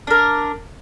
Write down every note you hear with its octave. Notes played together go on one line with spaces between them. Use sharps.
D4 A#4